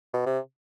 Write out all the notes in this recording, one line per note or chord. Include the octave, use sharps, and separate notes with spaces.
B2
C3